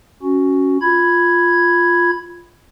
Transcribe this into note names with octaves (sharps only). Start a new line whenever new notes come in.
C#4 F#4
F4 B5 G#6